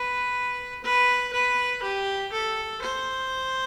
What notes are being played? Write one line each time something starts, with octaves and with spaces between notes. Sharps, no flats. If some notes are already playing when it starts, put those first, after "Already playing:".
Already playing: B4
B4
B4
G4
A4
C5